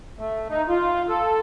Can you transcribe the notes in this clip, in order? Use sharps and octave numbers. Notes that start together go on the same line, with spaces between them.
A3
D#4
F4
A4